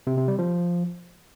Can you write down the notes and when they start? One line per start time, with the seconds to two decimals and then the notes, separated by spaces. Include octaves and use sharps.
0.07 C3
0.17 C3
0.28 G3
0.39 F3